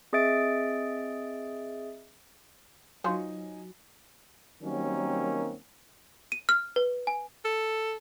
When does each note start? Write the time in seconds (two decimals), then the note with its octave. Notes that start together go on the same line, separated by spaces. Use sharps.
0.13 C4 G#4 D#5 E5 A6 D7
3.04 F#3 D#4 F4 C5 C#5 G#5
4.63 D#3 F#3 G3 A#3 C4 C#4
6.32 D#7
6.49 F6
6.76 B4
7.07 G#5
7.45 A4